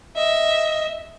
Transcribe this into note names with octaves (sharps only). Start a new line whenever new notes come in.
D#5 E5